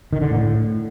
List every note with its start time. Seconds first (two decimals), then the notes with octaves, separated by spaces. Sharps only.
0.13 D#3
0.21 D3
0.30 A2